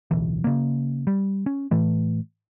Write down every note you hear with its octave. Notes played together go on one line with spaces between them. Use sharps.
D1 B1 E3
C#3 A#3
G3
C#4
A2 E3 A3